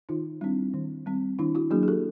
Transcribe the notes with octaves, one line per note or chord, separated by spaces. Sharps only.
D#3 D#4 F4
G3 C4 D4 E4
D#3
G3 C4
D#3 D4 E4
E4 F#4
F#3 A#3 D4 F#4 G#4
G#4
G4 A4